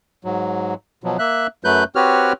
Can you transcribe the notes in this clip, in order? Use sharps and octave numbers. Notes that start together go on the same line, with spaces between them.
G#2 F#3
B2 F3 F#3
A#3 E5 F#6
F#2 F#3 A3 B4 F#6 G6
C4 F#4 G4 B4 C#5 F6